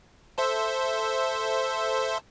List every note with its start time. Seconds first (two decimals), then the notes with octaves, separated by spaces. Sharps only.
0.38 A4 C5 E5